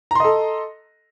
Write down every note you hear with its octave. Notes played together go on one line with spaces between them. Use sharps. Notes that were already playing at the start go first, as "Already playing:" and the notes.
A4 D#5 A#5 C6